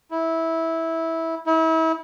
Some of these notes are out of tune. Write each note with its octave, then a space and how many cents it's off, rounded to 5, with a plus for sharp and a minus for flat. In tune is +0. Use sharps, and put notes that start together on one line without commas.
E4 -15
E4 -35